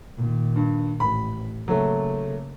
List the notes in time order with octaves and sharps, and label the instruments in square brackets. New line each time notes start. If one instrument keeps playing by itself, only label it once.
[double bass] A#2 D#3
[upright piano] G2
[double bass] A1 [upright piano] B5
[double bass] C#3 A#3 [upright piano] F#3 A3